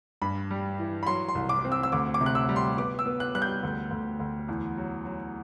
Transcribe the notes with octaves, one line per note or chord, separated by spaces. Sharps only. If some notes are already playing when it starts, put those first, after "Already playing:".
G2 B5
G3
E3
B5
F#3 C6
C6
C2
D6
C4
E6
E6
D2 D6
D6
C3
F#6
E6
G3
C6
B3 D6
E6
B3
F#6
G3 F#6
G6
D2
D2
D2
E2
F#3
F#3